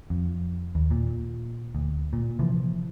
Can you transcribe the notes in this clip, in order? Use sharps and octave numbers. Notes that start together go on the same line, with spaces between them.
F2
D#2
A#2
D2
A#2
C3 E3 F3